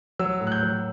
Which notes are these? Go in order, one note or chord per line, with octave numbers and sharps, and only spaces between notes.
F#3 E6
A2
F#6
G6
F#3